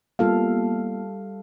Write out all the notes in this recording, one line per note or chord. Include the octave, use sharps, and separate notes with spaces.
G3 A#3 B3 F4 A4 F5